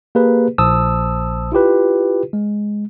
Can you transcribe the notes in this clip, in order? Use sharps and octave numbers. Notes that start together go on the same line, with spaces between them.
A#3 G4 G#4 B4
A#1 C5 A5 D#6 E6
E4 F4 G4 B4
G#3